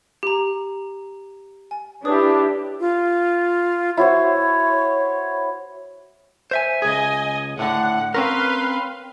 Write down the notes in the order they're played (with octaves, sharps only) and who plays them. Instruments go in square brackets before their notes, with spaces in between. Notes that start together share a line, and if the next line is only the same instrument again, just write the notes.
[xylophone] G4 A#5
G#5
[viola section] D4 E4 G4 [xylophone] B4 C#5 D#6
[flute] F4
[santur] E4 F#4 C5 [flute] C#5
[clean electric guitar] C5 E5 G#5
[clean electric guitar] C#2 G#4 [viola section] D#5 G#5
[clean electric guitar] A2 D3 [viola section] F#5
[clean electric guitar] C4 C#4 A#4 [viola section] B4 F5 C6